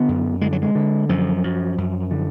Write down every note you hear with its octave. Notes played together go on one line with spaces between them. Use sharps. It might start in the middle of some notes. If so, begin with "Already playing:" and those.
Already playing: D3 B3
F#2
D3 G#3
F#3
G#3
D3
F#2 F3
F#2
F#2
D3